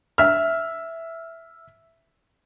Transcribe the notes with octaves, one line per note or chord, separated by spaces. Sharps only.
E5 F6